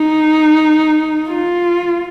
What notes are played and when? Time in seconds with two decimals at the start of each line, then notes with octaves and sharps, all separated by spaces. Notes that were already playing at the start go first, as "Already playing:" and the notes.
Already playing: D#4
1.29 F4